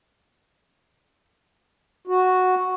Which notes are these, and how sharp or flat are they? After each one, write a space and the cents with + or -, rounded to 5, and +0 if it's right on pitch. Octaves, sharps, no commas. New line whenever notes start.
F#4 -5